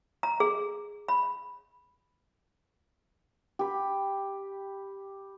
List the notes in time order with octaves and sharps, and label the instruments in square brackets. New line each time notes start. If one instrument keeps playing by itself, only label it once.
[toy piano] A#5
G#4
B5
[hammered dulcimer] G4 B5